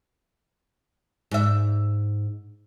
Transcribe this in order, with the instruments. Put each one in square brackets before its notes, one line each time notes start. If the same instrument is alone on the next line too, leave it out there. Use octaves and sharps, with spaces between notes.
[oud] G#2 E5